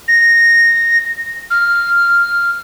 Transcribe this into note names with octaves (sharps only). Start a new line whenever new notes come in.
A#6
F6